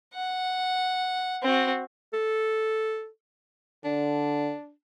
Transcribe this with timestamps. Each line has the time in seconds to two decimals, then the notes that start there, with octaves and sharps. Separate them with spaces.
0.14 F#5
1.42 C4 F#4
2.14 A4
3.85 D3 D4